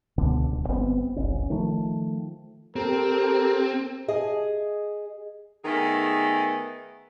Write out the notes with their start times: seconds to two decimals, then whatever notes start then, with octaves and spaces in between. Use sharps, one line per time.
0.18 C#2 G2 B2 D3
0.51 D1
0.68 G1 B3 C4
1.16 F#1 C2 C#4
1.50 D#3 F3 A3
2.76 C4 G4 A4 A#4
4.08 G#4 D#5
5.64 D#3 A3 B3 G#4